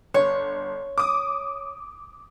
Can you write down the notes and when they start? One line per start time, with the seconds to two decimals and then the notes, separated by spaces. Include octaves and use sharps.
0.14 G1 C#5
0.98 D6 D#6